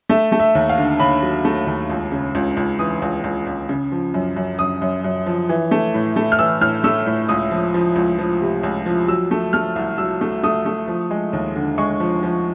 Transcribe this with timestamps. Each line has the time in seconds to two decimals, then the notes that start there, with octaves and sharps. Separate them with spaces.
0.09 A3 E5
0.32 A3
0.39 E5
0.55 D#2
0.69 F5
0.78 D3
1.00 D#2 B5
1.22 F#3
1.45 A3
1.67 D#2
1.90 C#2
2.12 C#3
2.35 C#2
2.57 C#2
2.79 E3 D#6
3.02 C#2
3.24 C#2
3.47 C#2
3.69 C#3
3.92 F3
4.14 F#2
4.36 F#2
4.59 F#2 D#6
4.82 F#2
5.04 F#2
5.26 F3
5.49 E3
5.71 A3
5.94 A2
6.16 A3
6.32 F6
6.39 E3 E6
6.61 A2 F6
6.84 A3 E6
7.06 A2
7.29 C#2 D#6
7.51 F3
7.74 F3
7.96 C#2
8.19 F3
8.41 C3
8.63 C#2
8.86 F3
9.08 F#3 E6
9.31 A3
9.53 A3 F6
9.76 C2
9.98 F#3 E6
10.21 A3
10.43 A3 D#6
10.65 A3
10.88 F3
11.11 G#3
11.33 D#2
11.56 D3
11.78 G#3 C#6
12.00 F3
12.23 F3